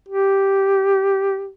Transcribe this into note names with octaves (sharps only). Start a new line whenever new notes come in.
G4